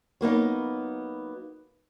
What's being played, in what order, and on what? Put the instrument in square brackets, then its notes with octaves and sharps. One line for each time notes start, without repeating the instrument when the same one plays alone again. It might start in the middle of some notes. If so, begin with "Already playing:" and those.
[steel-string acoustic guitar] F#3 A#3 B3 D#4